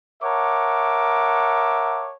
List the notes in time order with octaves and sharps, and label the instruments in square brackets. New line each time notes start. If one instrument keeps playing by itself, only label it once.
[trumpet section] A#4 C#5 E5 F#5 A5 D6